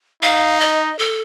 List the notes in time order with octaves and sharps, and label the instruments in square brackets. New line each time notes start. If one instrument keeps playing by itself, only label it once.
[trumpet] D#4 [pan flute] F5
[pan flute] D#5
A4